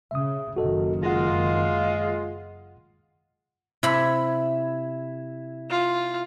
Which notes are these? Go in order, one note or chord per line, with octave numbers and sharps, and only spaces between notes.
C#3 E5 D#6
F#1 F#2 D#3 F#4 A4 D#5
G#3 F4 F#5 A#6
C3 E4 B5
F4